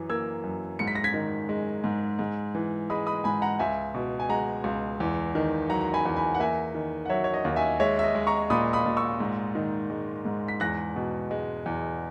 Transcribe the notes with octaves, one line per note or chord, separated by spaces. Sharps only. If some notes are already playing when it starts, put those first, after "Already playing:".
Already playing: F#2 E3
A#3 E6 G#6
F#2
G#2 C#7
B6
A#6
G#6 B6
D#3
G#3
G#2
G#2
E3
G#3 B5 D#6
B5 D#6
G#2 G#5 B5
F#5 A#5
C#2 E5 G#5
B2
G#5
G#3 F#5 A#5
C#2
E2
D#3
F#3 F#5 A#5
A#5
G#5 B5
E2
G#5 B5
F#5
A#3 E5 G#5
D#3
F#5
F#3 C#5 E5
C#5
D#5
D#2
E5 G#5
G#3 C#5 E5
E5
D#5
G#3
A#5 C#6
A#2 B5 D#6
B5 D#6
A#2
C#6 E6
G#2
D#3
G#3
G#2
B6
E2 F#6 A#6
B2
G#3
E2